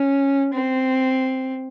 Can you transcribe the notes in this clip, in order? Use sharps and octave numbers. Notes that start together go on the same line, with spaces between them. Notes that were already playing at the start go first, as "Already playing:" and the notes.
Already playing: C#4
C4